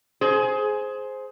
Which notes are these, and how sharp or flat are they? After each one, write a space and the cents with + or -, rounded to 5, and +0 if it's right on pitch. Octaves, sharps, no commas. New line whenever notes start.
G#4 +15 C5 +0